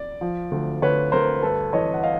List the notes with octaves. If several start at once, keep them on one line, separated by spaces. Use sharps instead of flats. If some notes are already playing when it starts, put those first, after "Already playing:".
Already playing: D5
F3
D2
D2 B4 C#5
D2 A#4 C5
G2 A4 B4
E3 C#5 D#5
F#5
D#5 F5